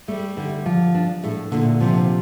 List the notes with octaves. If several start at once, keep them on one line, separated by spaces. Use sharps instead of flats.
G3 A3
D3
F3
D4
A2 A3
A#2 D3
C3 F3